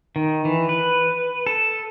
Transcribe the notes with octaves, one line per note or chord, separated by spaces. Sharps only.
D#3
E3
B4
A4